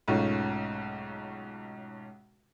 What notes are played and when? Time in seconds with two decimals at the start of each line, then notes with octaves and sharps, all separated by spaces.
0.08 B1 G#2 A3 C#4 F4